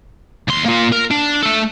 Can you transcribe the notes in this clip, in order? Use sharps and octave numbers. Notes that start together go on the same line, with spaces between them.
D#2 C6
A#3 F4
A#4
D4
A3 A4